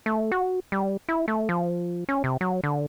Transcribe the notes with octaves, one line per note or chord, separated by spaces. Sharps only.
A3
F#4
G3
E4
A3
F3
C#4
C3
F#3
D3